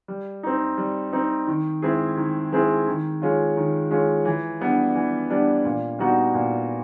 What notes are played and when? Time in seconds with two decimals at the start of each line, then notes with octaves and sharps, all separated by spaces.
0.08 G3
0.43 C4 D#4
0.78 G3
1.13 C4 D#4
1.47 D#3
1.82 G#3 C4 E4 G#4
2.17 D#3
2.52 G#3 C4 E4 G#4
2.87 D#3
3.22 G#3 C#4 F4
3.56 D#3
3.91 G#3 C#4 F4
4.25 E3
4.61 G3 B3 D4
4.95 E3
5.30 G3 B3 D4
5.65 A#2
5.99 G3 B3 D#4 F#4
6.34 A#2